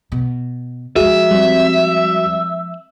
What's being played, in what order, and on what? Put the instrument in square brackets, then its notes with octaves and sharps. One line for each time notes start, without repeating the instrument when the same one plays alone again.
[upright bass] B2
[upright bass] F3 G#3 [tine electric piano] F#4 [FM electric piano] G#4 [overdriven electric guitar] E5
[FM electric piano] G3 C4